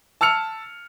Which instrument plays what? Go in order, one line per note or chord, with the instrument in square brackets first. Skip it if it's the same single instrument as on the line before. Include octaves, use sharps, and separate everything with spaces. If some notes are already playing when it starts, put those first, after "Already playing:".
[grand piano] A5 E6 F6 C#7 F7